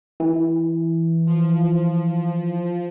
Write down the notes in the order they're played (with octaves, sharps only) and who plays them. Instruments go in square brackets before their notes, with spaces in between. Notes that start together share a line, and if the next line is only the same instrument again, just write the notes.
[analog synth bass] E3
[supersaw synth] F3